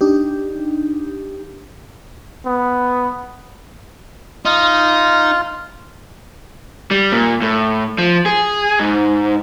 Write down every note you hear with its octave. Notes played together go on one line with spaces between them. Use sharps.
D4 D#4 G4
B3
D#4 F4
G3
A#2
A2
F3
G#4
G#2